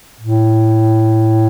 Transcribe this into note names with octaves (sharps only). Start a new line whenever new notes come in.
A2